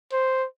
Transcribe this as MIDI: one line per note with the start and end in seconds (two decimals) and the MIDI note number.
0.13 0.45 72